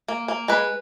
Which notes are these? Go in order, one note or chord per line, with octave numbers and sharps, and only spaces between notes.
A#3
A#3
G#3 B4